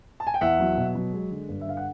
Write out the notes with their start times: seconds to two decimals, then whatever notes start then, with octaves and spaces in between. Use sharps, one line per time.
0.20 A5
0.27 G#5
0.34 G5
0.41 E2 E5 F#5
0.60 F#3
0.77 B2
0.95 F#3
1.13 G#3
1.31 D3
1.49 G2
1.61 E5
1.66 D3 F5
1.77 F#5